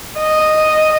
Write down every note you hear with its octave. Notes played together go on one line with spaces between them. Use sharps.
D#5